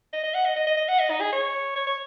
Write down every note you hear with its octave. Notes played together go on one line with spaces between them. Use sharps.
D#5
D#5
F#5
D#5
D#5
D#5
D#5
F#5
D#5
D#4
G#4
C#5
C#5
C#5